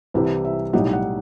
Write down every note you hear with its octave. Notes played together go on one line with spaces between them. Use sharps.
C2 C3 E3 G3 B4
E5
B1 A2 G3 D#4 F#5
F#5